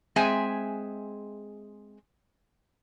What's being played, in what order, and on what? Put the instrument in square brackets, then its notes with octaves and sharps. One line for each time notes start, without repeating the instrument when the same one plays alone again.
[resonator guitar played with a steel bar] G#3 C4 G#4 E5 G#5